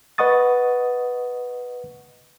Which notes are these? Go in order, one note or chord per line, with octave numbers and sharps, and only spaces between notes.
B4 D#5 F#5 C#6 D#6 A6